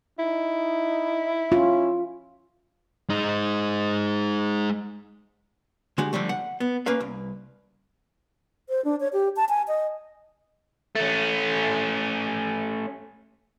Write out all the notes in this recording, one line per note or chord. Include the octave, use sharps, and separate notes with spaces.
D#4 E4
C#4 F4
G#3 D#4
D3 G#3 F#4 G4
D3 F3 G3 A3
F#5
B3
A#3 C#4 B4 F5
C2
C5
D4
C#5
G4
A5
G#5
D#5
A3 C#4